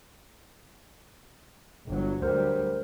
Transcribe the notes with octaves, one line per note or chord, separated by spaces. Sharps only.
G1 F#3
D2 F#3 G3 A#4 C5